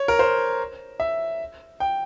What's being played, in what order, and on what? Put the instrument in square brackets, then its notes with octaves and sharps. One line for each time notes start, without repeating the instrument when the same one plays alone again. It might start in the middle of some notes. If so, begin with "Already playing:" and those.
Already playing: [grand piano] C#5
A#4
C5
E5
G5